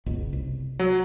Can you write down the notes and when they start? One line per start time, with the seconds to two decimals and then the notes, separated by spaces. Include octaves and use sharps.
0.06 F#1 C#2 B2
0.33 C2
0.79 F#3